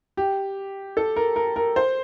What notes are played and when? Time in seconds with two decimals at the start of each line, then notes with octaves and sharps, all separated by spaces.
0.17 G4
0.97 A4
1.16 A#4
1.36 A#4
1.56 A#4
1.76 C5